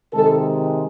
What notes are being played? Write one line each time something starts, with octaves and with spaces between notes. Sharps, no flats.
C3 D#3 G#3 A4